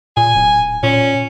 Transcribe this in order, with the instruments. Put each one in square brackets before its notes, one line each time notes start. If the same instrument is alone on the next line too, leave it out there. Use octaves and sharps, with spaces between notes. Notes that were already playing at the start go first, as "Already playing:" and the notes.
[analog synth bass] A#2 [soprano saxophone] G#5
[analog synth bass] D1
[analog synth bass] A#2 [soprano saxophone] C#4